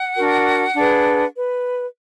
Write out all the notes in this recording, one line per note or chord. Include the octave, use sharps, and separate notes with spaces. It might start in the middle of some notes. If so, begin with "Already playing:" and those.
Already playing: F#5
D4 F#4 A#4
D4 G#4 B4
B4